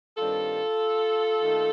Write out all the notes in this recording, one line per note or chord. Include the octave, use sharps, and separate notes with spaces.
G2 D#3 G3 C4 F4 A4
D#2 D#3 A3